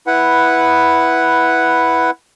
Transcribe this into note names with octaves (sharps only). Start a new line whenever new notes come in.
E4 B4 F#5